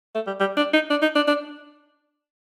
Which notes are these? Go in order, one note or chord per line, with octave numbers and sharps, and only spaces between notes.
A3
G3
G3
D4
D#4
D4
D#4
D4
D4